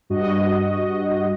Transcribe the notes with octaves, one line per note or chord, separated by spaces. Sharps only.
G2 F#4 D#5